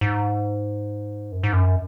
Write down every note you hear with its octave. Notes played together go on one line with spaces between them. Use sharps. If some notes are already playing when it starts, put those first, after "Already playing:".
G#2
F#2
G#2
F#2